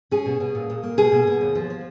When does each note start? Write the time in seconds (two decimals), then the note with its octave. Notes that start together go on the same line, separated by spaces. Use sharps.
0.11 C#4 G#4
0.26 B2
0.40 B2
0.55 A#2
0.70 A#2
0.83 A#3
0.97 B2 G#4
1.12 B2
1.27 B2
1.41 D#2
1.55 F3
1.70 F3